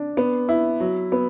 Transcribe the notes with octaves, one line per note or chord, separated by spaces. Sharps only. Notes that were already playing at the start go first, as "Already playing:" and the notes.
Already playing: D4
B3
E4
F#3
B3